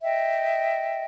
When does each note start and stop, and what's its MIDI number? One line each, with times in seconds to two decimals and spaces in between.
0.03 1.04 75
0.03 1.04 76
0.03 1.04 79